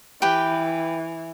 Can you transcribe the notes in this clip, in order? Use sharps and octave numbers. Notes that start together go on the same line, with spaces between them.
E3 G4 B4 G5